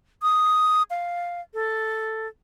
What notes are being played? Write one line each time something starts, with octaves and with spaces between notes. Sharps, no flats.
D#6
F5
A4